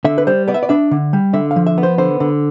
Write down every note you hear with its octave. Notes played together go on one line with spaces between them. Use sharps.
D3 E5
B4
G3 C5
B3 D5
E5
D5
D4 E5
D3
G3
D3 E5
F5
F3
E5
B3
C5
D3 C5
D3